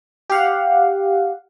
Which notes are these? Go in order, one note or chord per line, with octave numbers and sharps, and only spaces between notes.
G4 F5 F#5